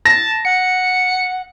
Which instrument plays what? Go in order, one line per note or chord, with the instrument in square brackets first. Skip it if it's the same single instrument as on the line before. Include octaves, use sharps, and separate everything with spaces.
[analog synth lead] A5 [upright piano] A#6
[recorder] F#5 [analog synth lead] C#7